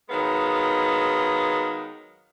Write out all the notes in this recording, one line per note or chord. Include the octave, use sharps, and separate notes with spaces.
D#3 F#3 G#3 B3 F5